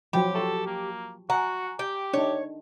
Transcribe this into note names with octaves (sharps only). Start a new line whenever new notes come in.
F3 F#3 F4 G4 C5 G5 B5
F#4 A4 A5 C#6
A#3
F#4 F#5 G#5 A#5
G4 G5
D4 D#4 C#5